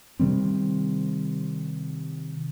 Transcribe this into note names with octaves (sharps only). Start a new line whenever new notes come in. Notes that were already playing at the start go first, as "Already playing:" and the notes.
C3 D#3 G3 C4